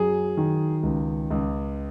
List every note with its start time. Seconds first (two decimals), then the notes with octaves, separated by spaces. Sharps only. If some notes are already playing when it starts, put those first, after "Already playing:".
Already playing: F#2 F#3 G#4
0.37 D#3
0.83 C#2
1.31 C#2